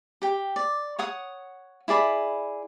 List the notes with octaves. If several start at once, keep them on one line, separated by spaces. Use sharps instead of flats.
G4 G5
D5
C#5 F#5 D#6
E4 G#4 D5 B5